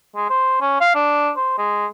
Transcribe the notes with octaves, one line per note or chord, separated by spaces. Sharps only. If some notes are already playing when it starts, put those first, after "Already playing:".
G#3
C5
C#4
F5
D4
C5
G#3